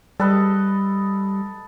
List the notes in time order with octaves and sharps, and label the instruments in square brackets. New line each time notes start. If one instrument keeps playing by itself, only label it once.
[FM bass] G3 [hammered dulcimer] A4 B4 D#5